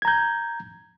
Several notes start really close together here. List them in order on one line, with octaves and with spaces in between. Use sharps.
G#6 A#5 G6